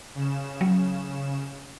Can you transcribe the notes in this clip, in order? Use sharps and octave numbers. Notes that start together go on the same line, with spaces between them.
C#3 E7
F#3